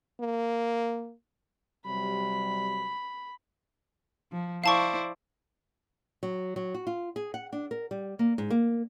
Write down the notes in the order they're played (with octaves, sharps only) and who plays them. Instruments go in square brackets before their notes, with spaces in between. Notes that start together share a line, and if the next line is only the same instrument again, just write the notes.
[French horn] A#3
[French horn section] C3 F#3 G3 [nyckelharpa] B5
[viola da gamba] F3
[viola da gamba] E4 C5 D5 [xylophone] F5 A5 C#6
[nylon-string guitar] F#3
F#3
F#4
F4
G#4
F#5
D4
A#4
G3
A#3
G#2
A#3